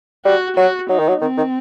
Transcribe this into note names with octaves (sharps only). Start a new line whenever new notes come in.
G3 F#4
F#3 F#4
F#3 D#4
D#3
F#3
D#3 C4
D#3